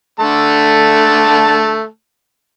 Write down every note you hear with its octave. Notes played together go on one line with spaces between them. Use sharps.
D3 A3 A5